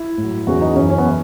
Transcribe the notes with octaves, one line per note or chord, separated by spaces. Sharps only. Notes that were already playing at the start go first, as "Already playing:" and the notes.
Already playing: E4
A2
F#3
E2 C#3 E3 F#4
D#4
F#2 E3 C#4
C#4
B3
E3